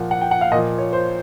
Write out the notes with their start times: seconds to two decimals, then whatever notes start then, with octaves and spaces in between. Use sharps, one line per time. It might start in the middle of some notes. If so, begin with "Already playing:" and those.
Already playing: A#2 F3 F#5
0.11 F#5
0.21 G5
0.31 F#5
0.41 F5
0.52 A#2 D#5
0.56 F3
0.78 C#5
0.93 C5